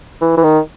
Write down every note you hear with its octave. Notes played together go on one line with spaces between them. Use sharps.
E3
E3
D#3